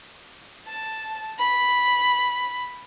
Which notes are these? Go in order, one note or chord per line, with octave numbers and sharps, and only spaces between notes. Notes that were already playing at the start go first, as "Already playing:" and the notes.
A5
B5